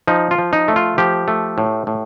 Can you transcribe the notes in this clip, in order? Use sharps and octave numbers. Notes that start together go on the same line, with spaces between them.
F3 D#4
F4
F3
D#4
A3
F4
F3 G4
A3
A2
A2